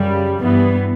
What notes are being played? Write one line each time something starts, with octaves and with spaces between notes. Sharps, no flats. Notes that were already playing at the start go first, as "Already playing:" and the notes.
Already playing: F#2 C#3 G3
G2 E3 B3